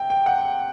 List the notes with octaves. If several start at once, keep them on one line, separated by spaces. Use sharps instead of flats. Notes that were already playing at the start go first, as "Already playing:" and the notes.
Already playing: C3 G5
G5
F#5